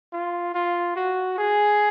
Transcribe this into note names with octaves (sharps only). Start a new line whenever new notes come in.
F4
F4
F#4
G#4